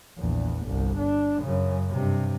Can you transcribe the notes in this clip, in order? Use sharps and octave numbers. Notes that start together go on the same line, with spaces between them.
A#1 E2
G1 C2
D4
F#2 C#3
G2 C3